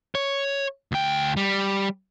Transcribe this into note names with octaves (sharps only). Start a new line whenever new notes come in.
C#5
D2 G5
G3